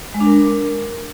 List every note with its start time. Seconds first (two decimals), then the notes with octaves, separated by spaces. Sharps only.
0.14 G#3
0.20 D4
0.26 A#4